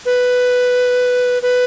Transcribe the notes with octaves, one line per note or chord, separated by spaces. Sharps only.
B4
B4